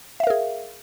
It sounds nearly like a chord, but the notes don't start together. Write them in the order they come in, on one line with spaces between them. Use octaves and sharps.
E5 F5 A#4 G#4